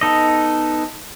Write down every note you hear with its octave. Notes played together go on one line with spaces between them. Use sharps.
B3 D#4 A4 D#5